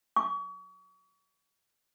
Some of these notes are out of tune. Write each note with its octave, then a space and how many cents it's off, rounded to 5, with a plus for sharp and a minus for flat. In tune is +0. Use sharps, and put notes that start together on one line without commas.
C#6 +40